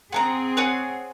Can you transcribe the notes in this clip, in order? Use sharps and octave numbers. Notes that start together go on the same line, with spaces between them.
C4 G#4 F#5 A5 A#5
C#5 F#5 G#5